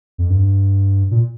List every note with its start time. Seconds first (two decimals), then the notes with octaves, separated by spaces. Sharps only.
0.18 F2
0.30 G2
1.11 A#2